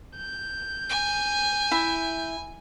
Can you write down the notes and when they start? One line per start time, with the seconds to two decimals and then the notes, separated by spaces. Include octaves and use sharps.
0.17 G6
0.89 G#5
1.71 E4